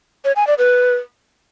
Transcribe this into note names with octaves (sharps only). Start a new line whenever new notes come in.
C#5
G#5
D5
B4